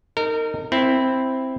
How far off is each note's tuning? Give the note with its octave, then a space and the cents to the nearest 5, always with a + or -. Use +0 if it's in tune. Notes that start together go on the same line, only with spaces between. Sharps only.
D#4 -5 A#4 -30
C4 +0 E4 +0